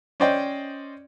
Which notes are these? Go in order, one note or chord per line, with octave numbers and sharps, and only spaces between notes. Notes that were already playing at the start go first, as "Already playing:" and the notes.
C#4 C5 D5 D#5 G5